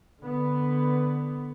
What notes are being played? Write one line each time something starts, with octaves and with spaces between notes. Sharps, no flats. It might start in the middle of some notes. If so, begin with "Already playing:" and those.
D3 B3